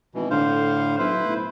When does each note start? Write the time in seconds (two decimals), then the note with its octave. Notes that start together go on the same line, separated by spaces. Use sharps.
0.15 G#1 B2 E3
0.31 A2 D3 C5 F5
0.99 B1 E4 B4 C5
1.26 A2